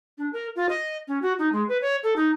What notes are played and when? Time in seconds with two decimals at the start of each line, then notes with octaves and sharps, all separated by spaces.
0.18 D4
0.33 A#4
0.56 F4
0.69 D#5
1.07 C#4
1.22 F#4
1.38 D#4
1.52 G#3
1.68 B4
1.81 C#5
2.03 A4
2.16 D#4